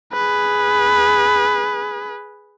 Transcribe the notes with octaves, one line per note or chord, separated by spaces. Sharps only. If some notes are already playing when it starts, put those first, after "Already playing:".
G#4 B4